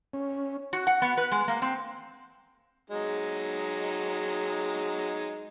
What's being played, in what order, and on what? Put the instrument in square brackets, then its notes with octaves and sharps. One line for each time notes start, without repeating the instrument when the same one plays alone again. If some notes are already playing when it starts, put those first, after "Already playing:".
[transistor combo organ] C#4
[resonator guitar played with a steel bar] F#4
F#5
B3
B4
G#3
A#3
C4
[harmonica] F#3 G#3 D#4